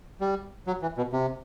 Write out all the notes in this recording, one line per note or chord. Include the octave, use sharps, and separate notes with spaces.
G3
F#3
E3
B2
C3